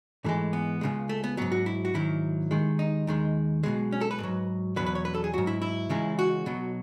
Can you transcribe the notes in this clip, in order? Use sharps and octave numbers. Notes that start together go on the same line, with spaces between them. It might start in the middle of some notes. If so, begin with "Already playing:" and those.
G#2 E3 G#3 A3
B3
C#2 C#3 G#3
A3
B3
G#2 F#3 B3
F#4
E4
F#4
G#2 D#3 F#3 E4
D#2 D#3 G#3
D#4
D#2 D#3 G#3
B1 B2 G#3
C#4
A4
B4
G#2 F#3
E2 B2 F#3 B4
B4
C#5
B4
A4
G#4
G#2 F#3 F#4
E4
E4
C#2 C#3 E3 G#3
F#4
B1 B2 F#3